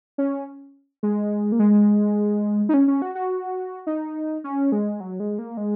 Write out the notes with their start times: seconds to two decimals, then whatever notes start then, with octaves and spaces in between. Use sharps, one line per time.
0.18 C#4
1.03 G#3
1.52 A#3
1.59 G#3
2.69 D#4
2.74 C#4
2.88 C#4
3.02 F#4
3.15 F#4
3.87 D#4
4.44 C#4
4.72 G#3
5.00 F#3
5.20 G#3
5.39 A#3
5.57 G#3